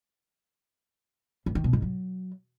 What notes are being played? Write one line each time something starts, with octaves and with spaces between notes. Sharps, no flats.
G2
D#3
B2
G#2
F#3